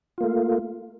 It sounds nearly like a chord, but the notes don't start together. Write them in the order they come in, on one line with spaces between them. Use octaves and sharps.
F4 A#3 A3